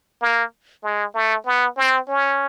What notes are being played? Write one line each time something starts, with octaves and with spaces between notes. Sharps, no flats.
A#3
G#3
A3
B3
C4
C#4